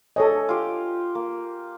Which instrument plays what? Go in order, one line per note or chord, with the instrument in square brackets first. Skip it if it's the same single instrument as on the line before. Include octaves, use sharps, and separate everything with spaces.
[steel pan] A4 C#5 D#5 [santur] G#5
[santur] F4 G4
A#3